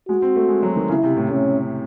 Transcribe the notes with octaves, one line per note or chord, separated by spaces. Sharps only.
G#3 F#4
C4
A3
G#3
F#3
D#3
C#3 E4
C3
A2
A2 C#4